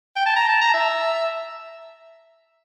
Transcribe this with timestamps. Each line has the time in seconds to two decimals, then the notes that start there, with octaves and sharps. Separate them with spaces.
0.16 G5
0.26 A5
0.36 A#5
0.49 A5
0.61 A#5
0.74 E5